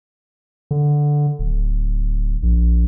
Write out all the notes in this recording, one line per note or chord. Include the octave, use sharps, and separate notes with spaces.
D3
D1
A#1